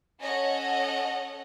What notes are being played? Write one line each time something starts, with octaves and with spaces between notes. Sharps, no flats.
C#4 A4 C#5 D#5 F#5